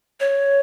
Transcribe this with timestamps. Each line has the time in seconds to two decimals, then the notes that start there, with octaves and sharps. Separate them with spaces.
0.20 C#5